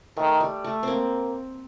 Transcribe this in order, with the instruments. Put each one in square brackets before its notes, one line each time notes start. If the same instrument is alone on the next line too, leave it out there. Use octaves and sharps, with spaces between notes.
[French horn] D#3 [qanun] A3
[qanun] G3
A3
A#3 C4